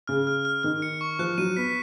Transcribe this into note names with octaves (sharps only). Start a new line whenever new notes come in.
C#3 F6
F6
F6
D#3 F6
C#7
C#6
F3 F#6
F#3 D#7
B3 B6